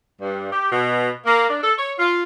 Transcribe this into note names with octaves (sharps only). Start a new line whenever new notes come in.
G2
G4
B2
A#3
D4
A4
C#5
F4